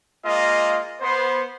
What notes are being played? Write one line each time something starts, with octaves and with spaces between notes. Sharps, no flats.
G#3 A#3 F4 D#5
B3 C5